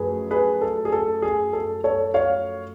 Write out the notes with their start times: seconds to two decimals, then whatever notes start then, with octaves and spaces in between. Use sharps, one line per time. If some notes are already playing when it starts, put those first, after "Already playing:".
Already playing: F#2 F3 A3 G#4 B4
0.31 G#4 B4
0.61 A4
0.85 G#4
0.92 A4
1.22 G#4
1.53 A4
1.84 A4 C#5
2.14 C#5 F5